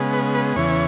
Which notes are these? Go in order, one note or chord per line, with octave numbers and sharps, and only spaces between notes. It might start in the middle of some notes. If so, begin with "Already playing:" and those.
Already playing: C#3 G#3 B3
B4
B4
E2 C#3 E3 C#5